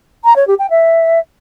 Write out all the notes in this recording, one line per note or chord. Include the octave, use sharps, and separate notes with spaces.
A#5
C#5
G4
G5
E5